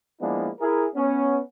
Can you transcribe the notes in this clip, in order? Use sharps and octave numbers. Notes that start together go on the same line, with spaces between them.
F3 G#3 A#3 B3 D4 E4
E4 G#4 A#4
B3 C#4